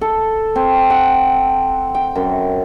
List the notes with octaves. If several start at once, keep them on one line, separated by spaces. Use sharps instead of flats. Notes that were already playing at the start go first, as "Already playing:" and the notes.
A4
C4
F#5
G5
F#2